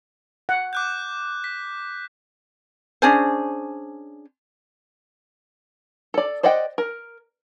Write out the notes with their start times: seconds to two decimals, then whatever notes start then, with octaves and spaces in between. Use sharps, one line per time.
0.49 F#5
0.73 D6 F#6 G6
1.44 B6
3.02 C#4 D4 G#4 C5
6.14 A4 D5
6.43 C5 D5 D#5 F#5 G5
6.78 A#4